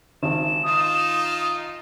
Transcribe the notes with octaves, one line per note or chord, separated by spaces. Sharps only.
G#1 E7
D#4 F4 D#6